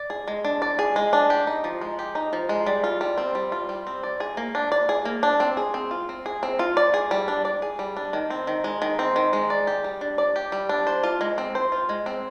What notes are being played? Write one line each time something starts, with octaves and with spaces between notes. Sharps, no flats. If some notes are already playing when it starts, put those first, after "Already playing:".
Already playing: D5
G#4
G#3
D4
D5
G#4
G#3
D4
G4
D#4
F3
G#3
G4
D#4
F3
G#3
G3
F4
G3
C4
G3
F4
G3
C4
D5
G#4
A#3
D4
D5
G#4
A#3
D4
C4
G#4
C4
F4
C4
G#4
C4
F4
D5
G#4
G3
D4
D5
G#4
G3
D4
D#3
C4
D#3
G#3
D#3
C4
D#3
G#3
D5
G4
G3
D4
D5
G4
G3
D4
C5
F4
G#3
C4
C5
F4
G#3
C4